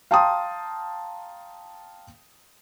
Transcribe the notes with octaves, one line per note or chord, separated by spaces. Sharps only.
F5 G5 A5 A#5 C6 D#6